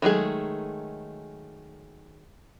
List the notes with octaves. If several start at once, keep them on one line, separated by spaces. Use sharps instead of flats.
D#3 F#3 G#3 A3 G#4